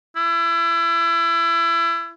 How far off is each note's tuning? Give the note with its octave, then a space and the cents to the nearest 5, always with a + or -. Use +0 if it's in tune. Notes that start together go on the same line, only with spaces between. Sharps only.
E4 +30